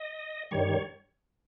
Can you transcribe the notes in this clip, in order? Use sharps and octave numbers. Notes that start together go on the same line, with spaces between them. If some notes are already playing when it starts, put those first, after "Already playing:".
Already playing: D#5
G2 D#3 G3 C#5